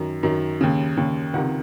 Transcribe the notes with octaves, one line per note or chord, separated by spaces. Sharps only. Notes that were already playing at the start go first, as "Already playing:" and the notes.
Already playing: F#2 D#3
F#2 D#3
D#2 C#3
D#2 C#3
C#2 C3 D#3 F#5